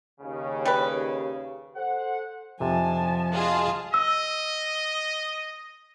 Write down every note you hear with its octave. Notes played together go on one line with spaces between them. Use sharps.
D#2 C#3
G3 B4
A4 C5 F#5
F2 C3 F3 G#5 A5
F4 F#4 G#4 D#5 A5
D#5 E6